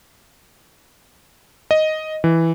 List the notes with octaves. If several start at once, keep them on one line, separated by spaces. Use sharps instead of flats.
D#5
E3